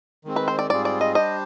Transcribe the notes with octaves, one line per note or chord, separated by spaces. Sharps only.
D#3 G#3 C4
B4
C5
D5
G#2 G3 C4 F4 G#4 D5
D5
D#5
G3 D4 G4 C5 D#5